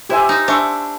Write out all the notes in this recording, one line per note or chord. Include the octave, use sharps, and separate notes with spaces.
E4 G4 C5 E5 G#5
D#4
D4 C5 E5 G#5 C#6